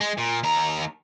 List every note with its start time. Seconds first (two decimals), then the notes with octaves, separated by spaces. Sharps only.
0.01 G#3
0.18 A#2
0.43 D#2 A#5